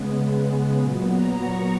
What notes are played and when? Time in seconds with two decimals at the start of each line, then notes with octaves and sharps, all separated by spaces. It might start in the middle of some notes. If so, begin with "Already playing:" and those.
Already playing: C#3 G#3 B3
0.79 A#2 F#3 B3
1.09 A#5
1.40 C#6